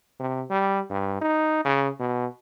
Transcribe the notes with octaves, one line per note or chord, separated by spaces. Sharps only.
C3
G3
G2
D#4
C#3
B2